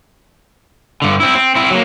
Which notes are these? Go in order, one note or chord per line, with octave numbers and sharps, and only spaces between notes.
G2 D3
C4 E4
C4
C4 E4
F#3 A#3